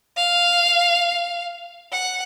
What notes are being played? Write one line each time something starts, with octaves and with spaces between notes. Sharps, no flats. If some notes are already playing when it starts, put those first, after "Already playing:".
F5
F#5